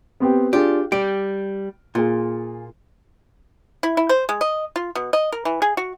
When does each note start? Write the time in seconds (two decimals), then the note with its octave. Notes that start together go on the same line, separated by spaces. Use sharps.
0.20 B3 C4 G4
0.53 D4 F4 G4 G#4
0.92 G3 G4 D7
1.95 A#2 F4 G#4
3.83 E4
3.97 E4
4.09 C5
4.29 G#3
4.41 D#5
4.76 F4
4.95 B2
5.13 D#5
5.32 A#4
5.45 E3
5.62 G#4
5.77 F#4